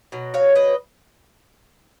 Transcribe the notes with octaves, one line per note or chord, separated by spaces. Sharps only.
B2 F#3
C#5 F5
B4 D#5